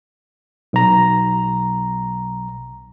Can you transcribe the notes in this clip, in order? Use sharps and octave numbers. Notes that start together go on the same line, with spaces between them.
B1 A#5